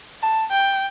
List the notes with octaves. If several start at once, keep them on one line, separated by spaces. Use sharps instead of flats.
A5
G5